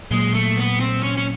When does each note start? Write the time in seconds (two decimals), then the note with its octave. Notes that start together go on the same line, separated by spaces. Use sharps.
0.11 A#2 F#3 G#3 A#3
0.34 A3
0.57 B3
0.80 C4
1.03 C#4
1.17 C#4